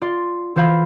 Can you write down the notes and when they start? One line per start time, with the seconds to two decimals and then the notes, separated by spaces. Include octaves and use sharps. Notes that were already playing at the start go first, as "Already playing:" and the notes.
0.02 F4 D5 C6
0.56 E3 F4 C5 F5 B5 G#6